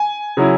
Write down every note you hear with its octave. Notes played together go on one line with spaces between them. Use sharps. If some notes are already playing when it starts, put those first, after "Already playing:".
Already playing: G#5
C#3 F#3 C#4 E4